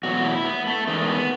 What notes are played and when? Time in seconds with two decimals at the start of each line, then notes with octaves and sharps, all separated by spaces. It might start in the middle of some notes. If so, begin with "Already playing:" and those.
0.03 E2 B2 F#3 A3 F#4
0.24 E4
0.45 B3
0.67 A3
0.87 E2 D#3 G#3 A3
1.08 B3